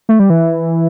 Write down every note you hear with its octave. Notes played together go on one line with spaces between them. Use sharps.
A3
G3
E3